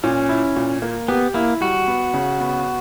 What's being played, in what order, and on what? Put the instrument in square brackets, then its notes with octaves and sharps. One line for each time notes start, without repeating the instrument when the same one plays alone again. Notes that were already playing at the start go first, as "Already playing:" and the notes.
[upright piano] A#2 [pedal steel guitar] C#4
[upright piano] E4
A#2
A#3
[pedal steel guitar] B3 [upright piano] G4
[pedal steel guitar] A#3 [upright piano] E4
[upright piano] G3 [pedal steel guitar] F#4
[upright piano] B3
C#3
B3